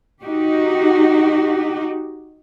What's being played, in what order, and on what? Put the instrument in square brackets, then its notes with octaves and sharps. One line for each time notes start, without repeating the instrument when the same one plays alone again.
[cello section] D#4 F#4 G4